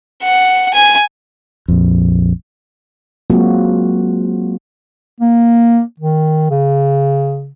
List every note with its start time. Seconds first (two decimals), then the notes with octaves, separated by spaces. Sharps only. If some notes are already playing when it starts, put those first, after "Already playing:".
0.24 F#5
0.74 G#5
1.68 A#1 F2
3.30 F#3 G#3 A#3 C4 F4 F#4
5.20 A#3
6.00 D#3
6.50 C#3